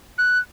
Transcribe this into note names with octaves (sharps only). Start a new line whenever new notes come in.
F#6